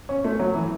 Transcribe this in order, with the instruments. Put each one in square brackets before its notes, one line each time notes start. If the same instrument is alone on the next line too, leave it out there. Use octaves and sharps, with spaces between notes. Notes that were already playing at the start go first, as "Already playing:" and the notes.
[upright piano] C#4
A3
F#3
E3